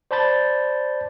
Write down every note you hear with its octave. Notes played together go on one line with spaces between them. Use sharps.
C5 D5 A5 B5 G6 A6